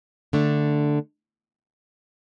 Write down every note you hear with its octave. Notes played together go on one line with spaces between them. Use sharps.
D3 A3 D4